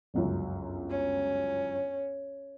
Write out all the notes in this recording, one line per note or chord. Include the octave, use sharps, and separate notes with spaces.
G1 C#2 F#2
C#4